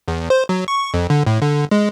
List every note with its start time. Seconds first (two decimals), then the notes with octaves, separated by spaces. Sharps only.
0.08 E2
0.30 C5
0.49 F#3
0.68 C#6
0.94 F2
1.10 D3
1.26 A2
1.42 D3
1.71 G#3